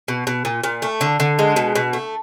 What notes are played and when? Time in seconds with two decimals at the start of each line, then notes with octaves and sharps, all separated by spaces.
0.08 B2
0.27 B2
0.45 A#2
0.64 A#2
0.82 A3
1.01 D3
1.20 D3
1.39 G#3
1.56 B2
1.75 B2
1.93 A3